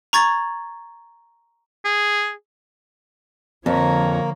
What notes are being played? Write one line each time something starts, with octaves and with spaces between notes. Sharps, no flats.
A#5 C#6 G#6 A6
G#4
F2 D3 F3 A#3 C#5 A#5